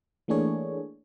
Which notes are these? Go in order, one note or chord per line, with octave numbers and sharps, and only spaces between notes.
E3 A3 A#3 D4 G#4 C#5